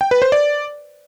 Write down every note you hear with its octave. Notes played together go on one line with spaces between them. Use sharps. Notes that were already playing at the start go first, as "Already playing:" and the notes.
G5
B4
C5
D5